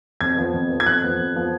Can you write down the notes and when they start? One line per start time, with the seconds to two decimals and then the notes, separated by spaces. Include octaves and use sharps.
0.21 F2 G#6
0.37 F3 B3
0.54 F2
0.69 F3 B3
0.80 G#6
0.86 F2 F#6
1.03 F3 B3
1.18 F2
1.36 F3 B3